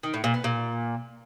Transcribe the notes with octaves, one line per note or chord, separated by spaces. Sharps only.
D#3
A2
A#2
B3
A#2